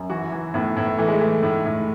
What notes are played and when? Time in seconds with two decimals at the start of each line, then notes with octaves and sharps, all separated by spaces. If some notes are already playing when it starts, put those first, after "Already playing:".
Already playing: F#2
0.09 E3 F#4
0.32 E3
0.54 A2 B3
0.77 A2
0.98 E3 A3
1.08 G#3
1.19 E3 A3
1.43 A2
1.65 A2